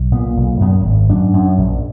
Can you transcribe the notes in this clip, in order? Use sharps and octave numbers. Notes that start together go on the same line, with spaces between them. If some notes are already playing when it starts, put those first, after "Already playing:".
Already playing: B1
A#2 B3
B1
F#2 B3
G#1
F#2 D4
F#2
A#1